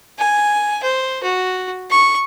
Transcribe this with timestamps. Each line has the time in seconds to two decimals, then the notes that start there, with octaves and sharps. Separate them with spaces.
0.18 G#5
0.83 C5
1.23 F#4
1.90 C#6